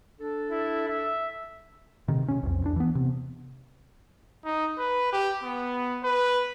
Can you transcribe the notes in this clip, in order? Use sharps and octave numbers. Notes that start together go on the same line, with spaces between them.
D4 A4
E4
E5
C3 D#3
C3 C#4
B1 F2
E2 D4
E3 B3
C3
D#4
B4
G4
B3
B4